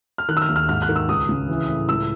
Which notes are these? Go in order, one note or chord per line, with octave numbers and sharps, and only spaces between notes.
F6
D#3 F#6
E6
F6
D#2
F6
G#2 F6
F#6
D#3
E6
C#2 D#6
C#3
E3
A2
C#2 E6